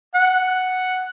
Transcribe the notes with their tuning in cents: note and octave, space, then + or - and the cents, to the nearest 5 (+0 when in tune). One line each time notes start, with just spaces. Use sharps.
F#5 +0